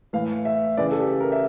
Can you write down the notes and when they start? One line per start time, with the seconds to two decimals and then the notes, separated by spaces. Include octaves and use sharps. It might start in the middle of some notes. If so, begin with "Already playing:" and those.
0.13 A2 E3 F5
0.45 E5
0.77 C#3 E3 D5
0.92 A4
0.99 G4
1.20 A#4
1.32 E5